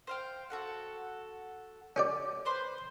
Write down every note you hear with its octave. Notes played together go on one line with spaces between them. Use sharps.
C5 F5 G5
F#4 A4 F#5
C#4 G4 D5
B4 C5 C6